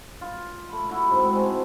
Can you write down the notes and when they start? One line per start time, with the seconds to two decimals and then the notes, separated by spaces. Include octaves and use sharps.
0.21 F4
0.69 A3 B5
0.89 E4 F#4
1.11 G#2 C4
1.35 G#3 A4